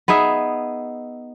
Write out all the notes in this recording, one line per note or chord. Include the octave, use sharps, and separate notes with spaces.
B3 D#4 G#4 E5